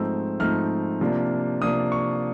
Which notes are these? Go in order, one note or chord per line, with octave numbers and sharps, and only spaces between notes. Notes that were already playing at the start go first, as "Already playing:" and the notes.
Already playing: G#2 F3 A3 C4 D#4 E6
G#2 F3 A3 C4 D#4 F6
C3 F3 A#3 D4
C3 F3 A#3 D4 D#6
C#6